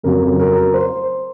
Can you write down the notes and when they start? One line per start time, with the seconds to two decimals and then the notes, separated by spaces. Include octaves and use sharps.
0.03 F2 C#3 F#3 A#4
0.39 A#4
0.74 C5